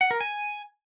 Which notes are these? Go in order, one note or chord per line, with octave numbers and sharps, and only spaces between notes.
F#5
A#4
G#5